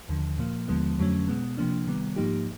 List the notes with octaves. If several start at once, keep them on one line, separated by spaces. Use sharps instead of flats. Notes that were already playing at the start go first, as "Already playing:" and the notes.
D#2 D3 F3
A#2 F3 A#3
D#2 D3 F3 G#3 B3
F2 D3 F#3 A3 C#4
B2 G#3 B3
C3 F3 A#3 D4
C3 D#3 G3 B3
G#2 F3 A#3 D#4 G4